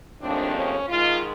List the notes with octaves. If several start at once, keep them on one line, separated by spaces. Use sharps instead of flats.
D#2 C#3 F3 A3 C4 D4
C#4
G#2 D#3 G#3 F4